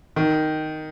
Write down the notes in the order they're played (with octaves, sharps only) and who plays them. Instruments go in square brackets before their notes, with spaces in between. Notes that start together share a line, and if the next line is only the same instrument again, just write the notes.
[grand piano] D#3